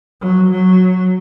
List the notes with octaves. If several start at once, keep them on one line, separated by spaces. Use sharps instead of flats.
F#3
F#3